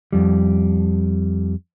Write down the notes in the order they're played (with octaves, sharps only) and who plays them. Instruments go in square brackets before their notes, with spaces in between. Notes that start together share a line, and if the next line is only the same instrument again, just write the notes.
[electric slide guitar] F2 G3